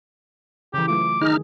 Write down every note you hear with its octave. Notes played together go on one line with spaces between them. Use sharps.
C#3 E3 G4
F#3 A3 F4 D6
D#3 D#4 G#4 F6